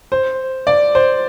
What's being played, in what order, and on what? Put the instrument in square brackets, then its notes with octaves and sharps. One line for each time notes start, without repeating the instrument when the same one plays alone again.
[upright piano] C5
D5
C5